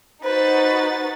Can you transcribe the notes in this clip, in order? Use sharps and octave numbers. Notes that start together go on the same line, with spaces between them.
D#4 F#4 B4 C5 A6